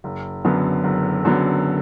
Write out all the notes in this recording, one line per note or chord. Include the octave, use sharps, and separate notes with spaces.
F#1
F#2 D3 F#3 B3
F#1
F#2 D3 F#3 B3